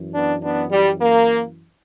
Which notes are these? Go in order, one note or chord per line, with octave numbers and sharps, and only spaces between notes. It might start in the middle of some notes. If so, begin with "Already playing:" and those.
Already playing: F#2 E3
B3 D4
B3 D4
G3
A#3